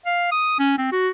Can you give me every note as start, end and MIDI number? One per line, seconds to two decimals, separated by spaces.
0.06 0.31 77
0.32 0.57 87
0.59 0.74 61
0.78 0.92 60
0.92 1.09 66